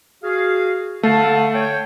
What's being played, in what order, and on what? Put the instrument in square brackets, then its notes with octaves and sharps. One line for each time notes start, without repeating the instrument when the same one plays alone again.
[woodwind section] F#4 G#4 F5
[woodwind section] D3 F5 A5 [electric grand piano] A3
[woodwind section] C#5 G5